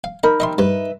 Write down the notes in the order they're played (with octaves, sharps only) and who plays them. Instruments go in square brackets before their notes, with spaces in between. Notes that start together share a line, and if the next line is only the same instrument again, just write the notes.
[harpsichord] F5
[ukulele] D#4 A#4 B5 [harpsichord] D#5
[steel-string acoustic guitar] D#3 G3 C4 [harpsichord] D#5 E5 C6
[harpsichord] G2 [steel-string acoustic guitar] B4 D#5 E5